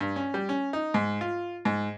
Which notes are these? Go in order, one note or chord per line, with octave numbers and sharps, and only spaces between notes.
G2
C#4
G3
C#4
D#4
G#2
F4
G#2